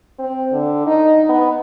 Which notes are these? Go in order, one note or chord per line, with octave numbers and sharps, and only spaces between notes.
C4
D3
D#4
B3